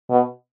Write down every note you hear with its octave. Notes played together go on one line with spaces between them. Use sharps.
B2